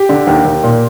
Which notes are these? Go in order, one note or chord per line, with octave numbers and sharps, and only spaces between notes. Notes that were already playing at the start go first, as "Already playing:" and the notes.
Already playing: G4
D3
D#2
D#2
A#2